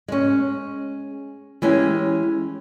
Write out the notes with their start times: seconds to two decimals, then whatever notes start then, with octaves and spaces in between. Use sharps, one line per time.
0.08 G#3 C#4
1.62 E3 G#3 C#4 G4 G#5